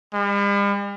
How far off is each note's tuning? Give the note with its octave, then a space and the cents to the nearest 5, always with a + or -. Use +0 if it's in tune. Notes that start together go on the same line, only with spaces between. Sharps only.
G3 +45